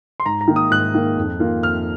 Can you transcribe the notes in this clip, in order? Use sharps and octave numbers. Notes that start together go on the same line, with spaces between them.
C6
G#2 A#5
A#5
D#3 A#3
D#6
G#2 F#6
D#3 A#3
F2
D#3 A#3 F4
F2 F6